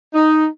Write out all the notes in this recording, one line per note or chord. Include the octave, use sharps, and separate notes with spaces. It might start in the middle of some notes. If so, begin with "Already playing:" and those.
D#4